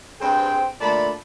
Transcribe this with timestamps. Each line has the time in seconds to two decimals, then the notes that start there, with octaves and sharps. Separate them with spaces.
0.21 G2 C4 G#4 C5 G5
0.81 A#2 D3 A3 D5 A5 B5